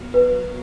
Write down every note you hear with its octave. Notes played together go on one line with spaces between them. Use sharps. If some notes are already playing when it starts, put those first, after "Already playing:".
Already playing: F#3 B3 F#4 A#4 F5
B4